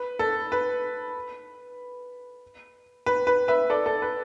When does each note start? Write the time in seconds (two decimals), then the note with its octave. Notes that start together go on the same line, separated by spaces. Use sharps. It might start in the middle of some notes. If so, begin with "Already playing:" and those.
Already playing: B4
0.19 A4
0.52 B4
3.06 B4
3.27 B4
3.48 B4 E5
3.70 A4 D5
3.86 A4
4.02 B4